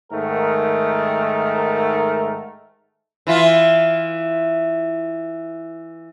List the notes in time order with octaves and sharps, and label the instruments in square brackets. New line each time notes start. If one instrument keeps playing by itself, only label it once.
[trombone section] G#2 D#3 A3 A#4
[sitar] E3 E4 F4